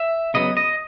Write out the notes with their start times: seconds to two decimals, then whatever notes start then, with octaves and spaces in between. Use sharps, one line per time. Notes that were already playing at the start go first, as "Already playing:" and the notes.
Already playing: E5
0.34 C#3 F#3 B3 D#5
0.57 D#5